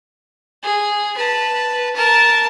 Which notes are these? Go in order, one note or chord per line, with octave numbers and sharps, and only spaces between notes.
G#4
B4 A5
A#4 A5